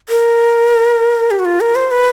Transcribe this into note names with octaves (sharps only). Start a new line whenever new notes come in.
A#4
G4
F#4
F4
A#4
C5
B4